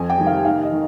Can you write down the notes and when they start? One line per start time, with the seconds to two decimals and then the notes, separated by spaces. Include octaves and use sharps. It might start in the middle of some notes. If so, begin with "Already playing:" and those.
Already playing: F2 G#5
0.10 G5
0.18 C3 D#3 G3
0.27 F5
0.45 D#2 F5
0.63 D#5
0.72 D#3